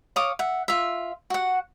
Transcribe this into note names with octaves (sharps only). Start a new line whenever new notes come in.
C#5 F5 D6 D#6
E5 F#5
F4 E5
F#4 F#5